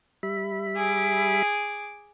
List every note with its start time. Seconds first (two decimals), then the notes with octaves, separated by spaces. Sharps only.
0.23 G3 E5 B5
0.76 G#4 D6